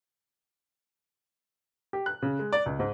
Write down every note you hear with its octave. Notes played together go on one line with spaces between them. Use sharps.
G4
F#6
C#3
G#3
D5
C#2
G#2